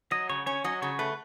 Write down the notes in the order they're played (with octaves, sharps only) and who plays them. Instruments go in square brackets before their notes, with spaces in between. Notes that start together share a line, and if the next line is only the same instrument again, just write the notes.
[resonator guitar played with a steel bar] F#3 [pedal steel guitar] D#5
[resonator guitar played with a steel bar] C#3 [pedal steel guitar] C#5
[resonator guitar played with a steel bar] C#4 [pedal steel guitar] C#5
[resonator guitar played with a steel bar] F#3 [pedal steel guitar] D#5
[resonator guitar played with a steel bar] C#3 [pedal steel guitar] C#5
[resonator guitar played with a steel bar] A3 [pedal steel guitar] B4